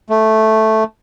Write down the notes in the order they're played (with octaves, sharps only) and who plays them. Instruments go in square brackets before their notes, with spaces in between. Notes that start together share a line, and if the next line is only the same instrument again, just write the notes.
[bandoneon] A3